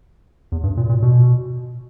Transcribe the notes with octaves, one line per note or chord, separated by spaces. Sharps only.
E2
G2
A#2
A#2
B2